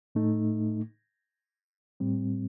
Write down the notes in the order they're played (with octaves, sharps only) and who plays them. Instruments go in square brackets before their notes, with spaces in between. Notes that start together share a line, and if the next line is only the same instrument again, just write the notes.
[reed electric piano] A2 A3 D#4
A2 G3 C4